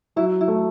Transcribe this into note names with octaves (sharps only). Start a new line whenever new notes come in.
F#3 E4
E4
A3